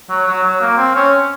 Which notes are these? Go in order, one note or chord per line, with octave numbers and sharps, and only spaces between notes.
F#3
F#3
F#3
A#3
C4
C#4